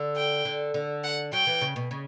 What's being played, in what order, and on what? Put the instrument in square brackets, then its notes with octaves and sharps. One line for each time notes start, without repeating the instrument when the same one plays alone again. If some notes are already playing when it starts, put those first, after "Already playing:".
Already playing: [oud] D3
[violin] G5
[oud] D3
D3
[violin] F#5
[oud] F#3 [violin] G5
[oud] E3
C#3
B2
C#3